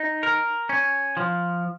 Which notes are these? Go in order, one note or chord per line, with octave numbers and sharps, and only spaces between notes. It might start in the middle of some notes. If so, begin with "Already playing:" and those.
Already playing: D#4
A#4
C#4
F3